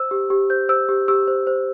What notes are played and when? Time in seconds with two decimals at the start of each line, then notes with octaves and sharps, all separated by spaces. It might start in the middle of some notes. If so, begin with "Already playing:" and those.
Already playing: C5 E6
0.11 G4
0.30 G4
0.50 C5 G6
0.69 C5 E6
0.89 G4
1.08 G4 E6
1.28 C5
1.47 C5